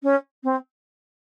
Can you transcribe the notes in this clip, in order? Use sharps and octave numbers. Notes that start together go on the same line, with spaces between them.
C#4
C4